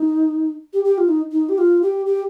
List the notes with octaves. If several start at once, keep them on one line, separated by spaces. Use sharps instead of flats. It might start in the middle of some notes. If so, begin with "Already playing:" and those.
Already playing: D#4
G4
G4
F4
D#4
D#4
G4
F4
G4
G4